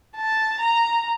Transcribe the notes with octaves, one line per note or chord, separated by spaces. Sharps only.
A5
A#5